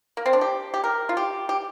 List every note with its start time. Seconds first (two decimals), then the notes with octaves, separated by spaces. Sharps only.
0.17 A#3
0.26 C4
0.33 D4
0.41 G4
0.74 G4
0.84 A#4
1.09 F4
1.17 G4
1.49 G4